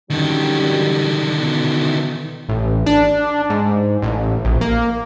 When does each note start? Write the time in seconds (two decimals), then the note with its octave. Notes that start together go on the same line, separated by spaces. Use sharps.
0.10 F#2 D3 D#3 F#3 G3
1.37 B2 E3
2.49 A1
2.86 D4
3.50 G#2
4.02 A1
4.45 A#1
4.61 A#3